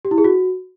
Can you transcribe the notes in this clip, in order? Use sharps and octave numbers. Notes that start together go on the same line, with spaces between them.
G4
E4
G#4
F#4